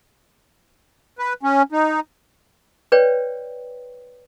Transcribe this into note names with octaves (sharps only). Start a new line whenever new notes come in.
B4
C#4
D#4
B4 C#5 D5 G5